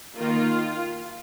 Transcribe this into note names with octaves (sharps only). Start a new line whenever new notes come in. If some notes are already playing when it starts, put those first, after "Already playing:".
D#3 A#3 F4